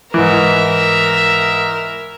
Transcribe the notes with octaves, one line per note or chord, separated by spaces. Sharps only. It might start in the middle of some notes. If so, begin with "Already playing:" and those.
G#2 E3 A#4 E5